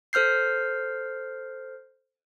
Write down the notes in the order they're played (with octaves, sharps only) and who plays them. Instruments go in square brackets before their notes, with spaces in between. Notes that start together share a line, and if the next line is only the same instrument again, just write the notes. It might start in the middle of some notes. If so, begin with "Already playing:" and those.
[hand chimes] A4 C5 F6 G6 C7